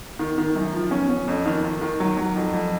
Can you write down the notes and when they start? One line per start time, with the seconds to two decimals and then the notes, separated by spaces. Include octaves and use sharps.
0.19 D#3
0.38 D#3
0.55 F#2
0.73 F3
0.91 C#4
1.10 C#4
1.28 F2
1.46 D#3
1.64 D#3
1.81 D#3
2.00 F#3
2.17 F#3
2.36 F2
2.53 F2